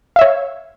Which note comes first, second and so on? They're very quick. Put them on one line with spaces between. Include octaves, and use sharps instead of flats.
F5 E5 C#5